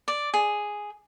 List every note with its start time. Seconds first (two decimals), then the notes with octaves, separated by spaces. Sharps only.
0.08 D5
0.34 G#4